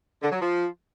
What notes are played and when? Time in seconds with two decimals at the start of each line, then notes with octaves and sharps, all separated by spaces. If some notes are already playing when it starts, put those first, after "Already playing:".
0.22 D3
0.31 F#3
0.41 F3